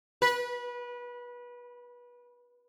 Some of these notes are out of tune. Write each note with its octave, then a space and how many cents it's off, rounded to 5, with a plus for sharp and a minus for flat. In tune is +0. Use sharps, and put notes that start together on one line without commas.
B4 -25